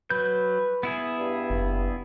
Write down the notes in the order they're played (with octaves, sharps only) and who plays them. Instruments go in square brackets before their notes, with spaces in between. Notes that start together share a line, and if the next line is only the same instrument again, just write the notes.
[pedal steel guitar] F#3 G6 [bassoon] B4
[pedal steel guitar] B3 E4 G#4
[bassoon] G2
[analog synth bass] F#1